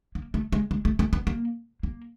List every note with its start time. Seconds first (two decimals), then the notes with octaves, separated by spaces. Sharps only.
0.15 A#3
0.34 A3
0.52 G#3
0.71 G#3
0.85 A3
0.99 A3
1.13 B3
1.27 A#3
1.83 A#3